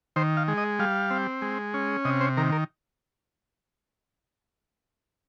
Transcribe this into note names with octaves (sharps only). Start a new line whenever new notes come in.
D#3 C5
F5
G#3
D#5
G3 F5
C4
G#3
C#4
C3 D#5
C5
D#3 A#4
A#4